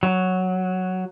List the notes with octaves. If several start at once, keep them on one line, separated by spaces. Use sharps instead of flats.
F#3